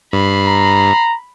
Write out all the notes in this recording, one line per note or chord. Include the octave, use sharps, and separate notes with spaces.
G2 B5 C7
A#5